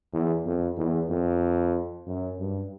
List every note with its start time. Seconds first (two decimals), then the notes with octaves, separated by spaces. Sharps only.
0.13 E2
0.45 F2
0.77 E2
1.09 F2
2.07 F#2
2.39 G2